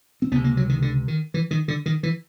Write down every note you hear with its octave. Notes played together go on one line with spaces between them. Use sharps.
C4
C#2 C3 B3
A#3
F#3
D#3
D3
D#3
E3
D#3
D3
D#3
E3